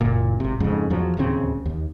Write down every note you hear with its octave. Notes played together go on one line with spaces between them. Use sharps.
F#1 A#2
G#1 C3
F2 G#2 C#3
E2 F3 F#3
D1 D#2 C#3 C4
D#2